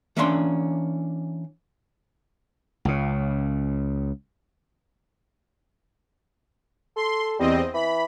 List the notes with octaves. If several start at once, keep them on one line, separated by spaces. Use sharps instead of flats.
E3 A#3 C#4 D4 A5 C6
C#2 C#3
A4 C6
E2 G3 C4 D#5
E3 B5